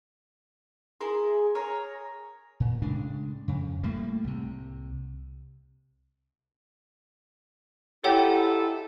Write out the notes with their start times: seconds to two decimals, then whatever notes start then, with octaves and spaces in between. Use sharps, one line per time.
1.00 E4 G#4 A#4 C6
1.55 G#4 A#4 C#5 A#5
2.60 A#2
2.82 A2 C#3 G#3 D4
3.48 F2 C#3
3.83 A2 G3 A3 A#3
4.24 C2 C3
8.04 G#2 E4 F4 G4 A4 C#5 F#5 G5